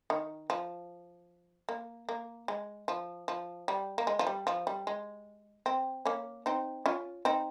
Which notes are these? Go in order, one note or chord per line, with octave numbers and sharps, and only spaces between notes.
D#3
F3
A#3
A#3
G#3
F3
F3
G3
A#3
G#3
F3
G3
F3
G3
G#3
C4
A#3 C#4
C4 D#4
C#4 F4
C4 D#4